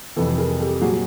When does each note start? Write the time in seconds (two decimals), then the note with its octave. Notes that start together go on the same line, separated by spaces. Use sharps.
0.16 F2 C3 E3 A4 B4
0.38 G#4 A#4
0.60 G4 A4
0.81 A#2 F#3 F#4 G#4